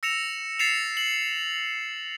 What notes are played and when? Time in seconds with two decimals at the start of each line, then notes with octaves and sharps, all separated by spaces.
0.03 E6 A#6 C#7 E7 F7
0.59 A6 C7 C#7 E7 F7
0.97 F#7